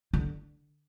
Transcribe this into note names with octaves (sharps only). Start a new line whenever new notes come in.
D3